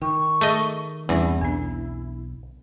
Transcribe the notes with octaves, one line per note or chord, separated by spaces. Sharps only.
D#3 G5 C#6
A3 G#4 D#5
E2 G2 G3 C4 C#4 E4
B1 B3 D4